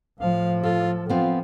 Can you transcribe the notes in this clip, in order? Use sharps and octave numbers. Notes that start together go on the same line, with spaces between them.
A2 F3 F5
F4 A4
F3 B3 C4 F4 F5